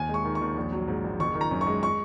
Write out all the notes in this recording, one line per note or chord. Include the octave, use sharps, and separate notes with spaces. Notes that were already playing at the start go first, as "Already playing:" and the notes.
Already playing: D#2 G#5
G#3
C#6
D#3
C#6
D#2
A#1
F#3
G#2
A#1
F#1 C#6
D#3
A#5
F#2
C#6
G#3
C#6